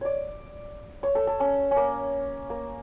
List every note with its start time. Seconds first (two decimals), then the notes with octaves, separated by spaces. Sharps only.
0.01 C#5 D5
1.03 C#5
1.15 A4
1.27 A4
1.40 C#4
1.71 C#4
1.76 A#3
2.50 A#3